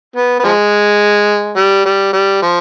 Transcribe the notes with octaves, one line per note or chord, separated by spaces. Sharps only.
B3
B3
F3 G#3
G3
G3
G3
F3